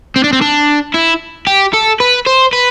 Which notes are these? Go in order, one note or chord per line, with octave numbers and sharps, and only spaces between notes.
C4
D4
C4
D4
E4
G4
A4
B4
C5
B4